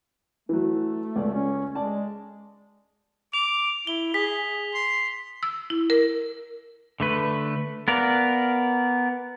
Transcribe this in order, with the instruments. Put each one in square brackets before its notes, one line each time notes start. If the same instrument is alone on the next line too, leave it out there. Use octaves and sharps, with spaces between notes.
[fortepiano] E3 F#3 [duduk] A3
[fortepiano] C#2 D5
[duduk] C#4
[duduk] G#3 [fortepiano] D5 A5
[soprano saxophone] D6 [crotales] F7
[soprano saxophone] E4 [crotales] G7
[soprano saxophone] G#4 [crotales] B6
[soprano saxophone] C6
[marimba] E6
E4
A#4
[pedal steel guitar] D3 A3 B4
B3 A#4 D5 F5